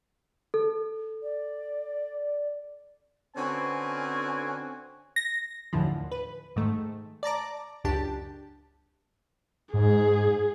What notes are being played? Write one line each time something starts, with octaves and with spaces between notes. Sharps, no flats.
A4
D5
D3 C4 C#4 F#4 B4 G#5
A#6
D#2 A2 D3 E3 F3
B4
G#2 D#3 A3
D5 A5 A#5 D6
C#2 F#2 D4 G4 A5
G#2 G#4